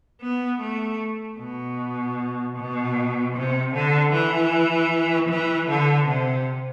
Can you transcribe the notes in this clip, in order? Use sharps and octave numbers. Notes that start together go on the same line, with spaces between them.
B3
A3
B2
B2
C3
D3
E3
E3
D3
C3